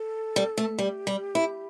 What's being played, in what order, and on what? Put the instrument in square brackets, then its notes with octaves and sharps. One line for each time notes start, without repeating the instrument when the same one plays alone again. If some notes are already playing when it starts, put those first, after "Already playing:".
Already playing: [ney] A4
[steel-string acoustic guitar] G3
A3
[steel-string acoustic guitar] G3 [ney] G4
[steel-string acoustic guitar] G3
E4